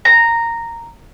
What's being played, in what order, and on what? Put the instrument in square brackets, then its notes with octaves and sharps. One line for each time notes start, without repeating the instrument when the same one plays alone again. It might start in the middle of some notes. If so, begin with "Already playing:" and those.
[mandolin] A#5